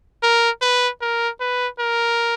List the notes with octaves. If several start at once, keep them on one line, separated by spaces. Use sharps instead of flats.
A#4
B4
A#4
B4
A#4